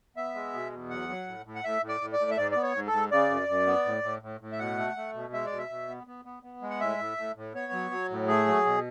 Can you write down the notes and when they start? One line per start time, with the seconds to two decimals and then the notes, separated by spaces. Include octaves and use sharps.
0.17 B3 E5
0.34 G#3
0.53 B2
0.72 E2
0.90 F#3 F#5
1.09 F#3
1.27 A2
1.45 A2
1.55 F#5
1.64 A2 E5
1.82 A2
1.89 D5
2.01 A2
2.13 D5
2.19 A2
2.30 E5
2.37 G#2 D5
2.51 B3 D5
2.63 C#5
2.75 G#2
2.87 A4
2.92 G#2
3.11 C#3 D5
3.30 F#2
3.48 F#2
3.67 B3
3.86 A2
4.03 A2
4.22 A2
4.41 A2
4.52 E5
4.59 B2 F#5
4.78 A3
4.96 A3
5.14 B2
5.33 G#3 E5
5.46 D5
5.52 B2
5.58 E5
5.70 B2
5.89 B3
6.07 B3
6.25 B3
6.43 B3
6.62 G#3
6.70 F#5
6.80 A2 E5
6.98 A2
7.18 A2
7.36 A2
7.54 B3 C#5
7.73 F#3
7.91 F#3
8.10 A2
8.28 A3 G#4
8.47 F#3
8.65 B2